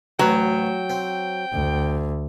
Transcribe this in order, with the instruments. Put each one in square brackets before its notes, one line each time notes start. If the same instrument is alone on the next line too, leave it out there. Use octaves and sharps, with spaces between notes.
[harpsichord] A1 D2 B4 [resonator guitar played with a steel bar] F#3 [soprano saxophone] G5
[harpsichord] C4
[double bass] D2